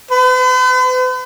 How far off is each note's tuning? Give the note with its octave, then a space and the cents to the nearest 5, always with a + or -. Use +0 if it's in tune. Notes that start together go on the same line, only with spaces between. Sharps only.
B4 +45